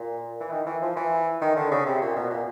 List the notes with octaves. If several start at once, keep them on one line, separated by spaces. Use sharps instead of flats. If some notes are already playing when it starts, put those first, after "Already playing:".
Already playing: A#2
E3
D#3
E3
F3
E3
D#3
D3
C#3
C3
A#2
B2
A#2